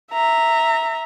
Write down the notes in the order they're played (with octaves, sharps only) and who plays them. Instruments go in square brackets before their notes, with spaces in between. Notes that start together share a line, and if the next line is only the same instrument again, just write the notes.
[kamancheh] E5 A#5